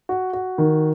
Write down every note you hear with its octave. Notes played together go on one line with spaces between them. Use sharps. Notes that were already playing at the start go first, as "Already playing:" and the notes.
F#4
F#4
D#3